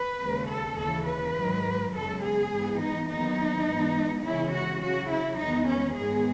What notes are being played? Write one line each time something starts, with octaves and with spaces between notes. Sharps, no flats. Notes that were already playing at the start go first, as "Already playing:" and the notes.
Already playing: B4
D#2 C#3 G#3
A4
D#2 C#3 E3 A4
B4
G#2 D#3 F#3
F#2 C#3 G#3 B3 A4
G#4
G#2 E3 B3
D#4
D#2 D#3 F#3 B3 D#4
G#2 E3 B3
C#3 E3 G#3 C#4 E4
F#4
C#3 F#3 C#4 F#4
E4
E2 D#3 G#3 B3 D#4
C#4
G#2 D#3 G#3 B3 G#4